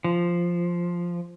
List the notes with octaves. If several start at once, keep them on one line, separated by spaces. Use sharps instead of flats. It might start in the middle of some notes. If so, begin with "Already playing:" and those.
F3